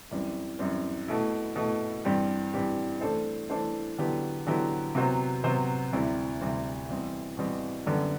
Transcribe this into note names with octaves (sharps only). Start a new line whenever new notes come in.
F#2 E3 G3 C4
F#2 E3 G3 C4
B2 A3 E4
B2 A3 E4
G2 E3 G3 C4 G4
G2 E3 G3 C4 G4
E3 A3 D4 A4 C5
E3 A3 D4 A4 C5
D3 F#3 B3 E4 G4
D3 F#3 B3 E4 G4
C3 F#3 B3 F#4 C5
C3 F#3 B3 F#4 C5
D2 C3 G3 C4 E4
D2 C3 G3 C4 E4
E2 B2 G3 C4
E2 B2 G3 C4
F#2 D3 G3 B3